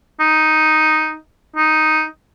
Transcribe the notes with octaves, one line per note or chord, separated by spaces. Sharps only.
D#4
D#4